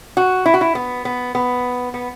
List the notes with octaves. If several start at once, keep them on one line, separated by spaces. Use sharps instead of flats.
F#4
E4
F#4
E4
B3
B3
B3
B3